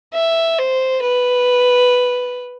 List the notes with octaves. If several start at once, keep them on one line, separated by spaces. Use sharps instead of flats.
E5
C5
B4